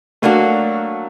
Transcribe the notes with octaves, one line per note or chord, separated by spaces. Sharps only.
F#3 A3 A#3 D4 F#4